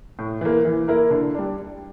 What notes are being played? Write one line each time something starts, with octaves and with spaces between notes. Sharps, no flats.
A2
E3 A#3
E3
A#3 E4 A#4
D3
G3 D4